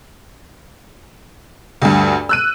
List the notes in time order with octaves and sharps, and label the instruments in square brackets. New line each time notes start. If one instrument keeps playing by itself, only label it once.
[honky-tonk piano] D2 G2
E6 F#6 D#7